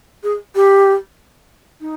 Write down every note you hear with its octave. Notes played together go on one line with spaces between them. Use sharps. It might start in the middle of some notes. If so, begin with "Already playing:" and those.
G#4
G4
D#4